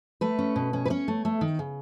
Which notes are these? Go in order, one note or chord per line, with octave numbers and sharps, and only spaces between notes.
A3 B4
C#4
B2
C#4
B4
C#4 C#5
A3
A3
D#3
C#3